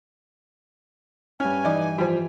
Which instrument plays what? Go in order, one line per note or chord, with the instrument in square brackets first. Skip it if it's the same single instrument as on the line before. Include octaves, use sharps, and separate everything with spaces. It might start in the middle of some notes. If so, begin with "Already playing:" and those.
[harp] G2 F6 [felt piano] C#4 [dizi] G#5
[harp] E3 [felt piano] D#4 D5
[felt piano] F3 G3